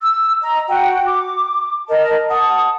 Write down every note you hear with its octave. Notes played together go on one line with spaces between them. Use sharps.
E6
D#5 A#5
F#4 F#5 G5
D6
A#4 D#5 A5
F#5 A5 D#6